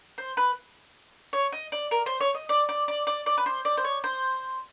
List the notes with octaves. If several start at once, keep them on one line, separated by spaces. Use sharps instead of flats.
C5
B4
C#5
D#5
D5
A#4
C5
C#5
D#5
D5
D5
D5
D5
D5
B4
C5
D5
C5
C#5
C5